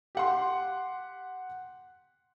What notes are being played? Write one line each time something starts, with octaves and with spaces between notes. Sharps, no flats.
G4 F#5 C6